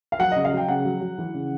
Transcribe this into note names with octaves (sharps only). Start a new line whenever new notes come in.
F5
F#3 F#5
C#3 D#5
F5
F#3 G5
C#3 F#5
F#3
F#3
E3
C#3